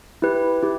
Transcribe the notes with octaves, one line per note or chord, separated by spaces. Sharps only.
E4 G4 B4
E4 G4